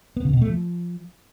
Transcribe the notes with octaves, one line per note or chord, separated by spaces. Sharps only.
B3
C#3
B2
A3
F3